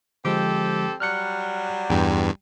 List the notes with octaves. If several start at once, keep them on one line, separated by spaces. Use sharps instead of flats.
D3 F3 G#3 C4 G4 A4
F#3 G3 F6 F#6 C#7
E2 G2 G5